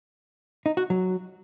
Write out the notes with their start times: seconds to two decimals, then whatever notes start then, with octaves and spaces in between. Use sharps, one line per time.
0.66 D#4
0.77 F#4
0.90 F#3